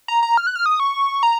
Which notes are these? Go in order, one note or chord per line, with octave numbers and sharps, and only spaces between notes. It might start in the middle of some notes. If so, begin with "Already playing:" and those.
A#5
A#5
F6
F#6
F6
D#6
C#6
A#5